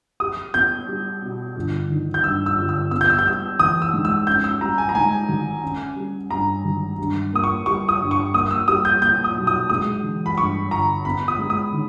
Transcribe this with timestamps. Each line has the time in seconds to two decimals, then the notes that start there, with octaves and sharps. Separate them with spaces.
0.20 G4 D#6
0.54 B3 G6
0.88 G3
1.22 B2
1.56 G1
1.90 D#3
2.14 G6
2.24 G2 E6
2.46 E6
2.58 G1
2.69 E6
2.91 B3 E6
3.01 G6
3.10 E6
3.19 G6
3.26 G3 E6
3.59 E3 D#6
3.82 E6
3.93 G#2
4.05 E6
4.27 C#4 G6
4.44 E6
4.61 G3 A#5
4.78 G#5
4.89 A#5
4.95 G#2 G#5
5.29 G#1
5.63 C#4
5.96 G3
6.30 G2 A#5
6.65 G#1
6.98 G2
7.32 A#3 D#6
7.44 C#6
7.66 G3 C#6
7.89 D#6
8.00 G2
8.11 C#6
8.34 A#3 D#6
8.51 E6
8.68 G3 D#6
8.85 G6
9.02 A#2 G6
9.24 D#6
9.36 B1
9.47 D#6
9.70 G#3 D#6
10.03 E3
10.26 B5
10.37 G2 C#6
10.71 G1 A#5
11.05 B3 B5
11.28 D#6
11.38 G#3
11.50 D#6
11.73 D#3